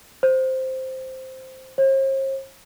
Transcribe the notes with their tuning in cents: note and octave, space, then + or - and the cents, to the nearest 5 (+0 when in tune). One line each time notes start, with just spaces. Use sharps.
C5 +0
C5 +45